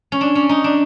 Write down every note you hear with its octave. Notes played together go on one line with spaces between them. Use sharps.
C#4
D4
C#4
D#4
D4